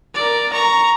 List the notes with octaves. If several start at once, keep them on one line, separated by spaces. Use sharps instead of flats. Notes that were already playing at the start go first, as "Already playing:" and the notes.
A#4 D5
A#5 C#6